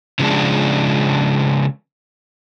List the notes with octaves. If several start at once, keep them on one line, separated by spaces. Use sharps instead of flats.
C#3 F3 F#3 G#3 D4